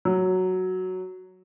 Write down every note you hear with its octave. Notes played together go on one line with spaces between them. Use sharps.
F#3